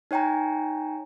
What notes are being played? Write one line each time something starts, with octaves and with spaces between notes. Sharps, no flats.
D#4 C#5 G5 G#5 A#5